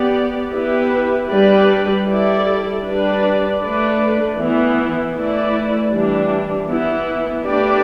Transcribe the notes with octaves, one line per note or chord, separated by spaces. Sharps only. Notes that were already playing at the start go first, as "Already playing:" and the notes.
Already playing: B3 G4 D5
B3 E4 G4 B4
G3 D4 B4 D5
G3 E4 A4 D5
G3 D4 B4 D5
A3 D4 B4 D5
E3 B3 E4
E3 A3 E4 B4 D5
E3 G3 D4
E3 B3 E4
A3 D4 G4 B4 D5